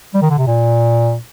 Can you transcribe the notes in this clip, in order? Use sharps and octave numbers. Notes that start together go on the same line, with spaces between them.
G3
D#3
D3
C3
A#2